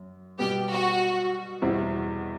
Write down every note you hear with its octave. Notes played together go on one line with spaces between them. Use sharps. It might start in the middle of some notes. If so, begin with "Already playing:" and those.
Already playing: F#2
B2 G3 B3 G4
F#4
E2 B2 G3 C4 E4